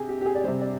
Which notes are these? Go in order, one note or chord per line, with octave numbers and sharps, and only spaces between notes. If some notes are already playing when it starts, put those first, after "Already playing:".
Already playing: C3 G#4
G4
G4
G#4
D5
C3 G3 C5
D5